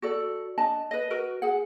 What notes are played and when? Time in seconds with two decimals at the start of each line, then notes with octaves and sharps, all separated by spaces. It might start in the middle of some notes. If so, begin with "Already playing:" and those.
0.02 F#4 A4 D5
0.58 D4 D#5 A5
0.91 B4 D#5
1.10 F#4 A#4 B4
1.42 G#4 F#5